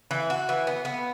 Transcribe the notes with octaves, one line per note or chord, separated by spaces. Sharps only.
E3
F#4
E3
B3
B3